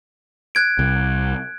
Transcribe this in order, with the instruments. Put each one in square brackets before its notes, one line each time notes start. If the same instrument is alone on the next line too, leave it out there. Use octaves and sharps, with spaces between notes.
[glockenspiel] F#6 G#6 D7
[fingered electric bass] C2